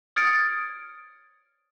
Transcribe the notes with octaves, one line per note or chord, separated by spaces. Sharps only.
D#6 F6 G#6 A6 C#7 D7